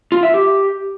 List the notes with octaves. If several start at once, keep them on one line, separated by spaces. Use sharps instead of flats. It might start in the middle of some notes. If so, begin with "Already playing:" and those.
F4
E5
G4